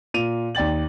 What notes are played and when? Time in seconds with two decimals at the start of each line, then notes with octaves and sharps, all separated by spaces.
0.14 A#2 D#7 F7
0.55 D#2 D5 G5 A6 F#7